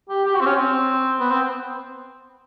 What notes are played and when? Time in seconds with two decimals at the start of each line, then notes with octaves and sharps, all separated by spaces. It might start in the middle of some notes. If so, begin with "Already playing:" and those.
0.09 G4
0.25 G4
0.35 F#4
0.41 C4
0.46 C#4
0.56 C4
1.20 B3
1.30 C4